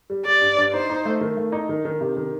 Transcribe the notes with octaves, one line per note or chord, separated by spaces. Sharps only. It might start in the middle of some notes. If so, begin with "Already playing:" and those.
G3
G3 D5
G2
G2
D#4 C5
D#4
A3
D#3
A3
D#4
D#3
D#3
C3
D#3